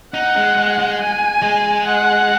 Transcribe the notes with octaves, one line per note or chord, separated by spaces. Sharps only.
D#4 F#5
G#3
G#3
G#3
G#5
G#3
F#5